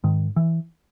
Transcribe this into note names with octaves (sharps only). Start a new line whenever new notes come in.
G#2 D#3
E3